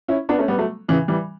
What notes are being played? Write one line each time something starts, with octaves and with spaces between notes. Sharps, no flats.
C#4 E4
B3 D4
A3 C#4
G3 B3
F#3 A3
C#3 E3
E3 G3